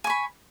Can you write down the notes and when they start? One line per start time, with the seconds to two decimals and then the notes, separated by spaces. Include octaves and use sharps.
0.04 G#5
0.07 C#6
0.10 B5